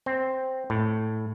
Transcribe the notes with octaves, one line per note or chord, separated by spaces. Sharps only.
C4
A2